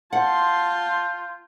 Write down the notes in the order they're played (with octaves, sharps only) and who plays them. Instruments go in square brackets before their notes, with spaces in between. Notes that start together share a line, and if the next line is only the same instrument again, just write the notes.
[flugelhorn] F4 [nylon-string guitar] F#5 [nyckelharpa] A5 C6 [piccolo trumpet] G6